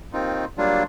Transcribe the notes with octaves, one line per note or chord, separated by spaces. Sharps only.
D#2 D#3 C4 D#4 F4
F#3 G3 A#3 D4 F4